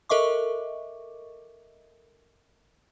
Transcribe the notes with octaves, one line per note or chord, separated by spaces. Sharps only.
A4 A#4 D#5 E5 C#6 D6